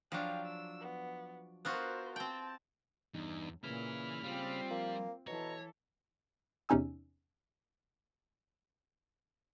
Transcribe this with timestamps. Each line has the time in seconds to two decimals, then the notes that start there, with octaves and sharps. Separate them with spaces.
0.12 F3 F#3 D4 F5 G5
0.45 E6
0.80 B3
1.65 B3 F4 F#4 A#4 C5
2.16 C4 G5 A5
3.14 E2 G2 D#4
3.64 A#2 C#3 E4 B4 B5 F6
4.23 G3 C4 F4
4.71 F3 A#3
5.27 B2 E3 A4 C#5 A#5
6.69 E2 C3 C#4 D#4 G#5 E6